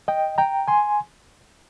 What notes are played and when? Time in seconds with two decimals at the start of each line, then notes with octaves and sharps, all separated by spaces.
0.08 D#5 G5
0.38 G5 A#5
0.68 G#5 C6